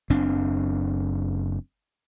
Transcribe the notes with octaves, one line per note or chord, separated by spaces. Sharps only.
F#1 F#2 C4 D4